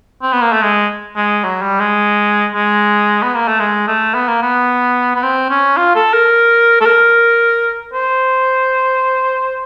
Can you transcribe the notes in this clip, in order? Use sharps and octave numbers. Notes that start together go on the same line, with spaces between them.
C4
B3
A#3
A3
G#3
G#3
F#3
G3
G#3
G#3
B3
A#3
A3
G#3
A3
B3
A#3
B3
B3
C4
C#4
F4
A4
A#4
A4
A#4
C5